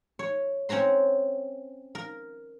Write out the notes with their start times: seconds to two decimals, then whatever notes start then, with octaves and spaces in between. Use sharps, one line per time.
0.19 C#5
0.69 C4 C#4 C#5 A#5 C6
1.95 A#4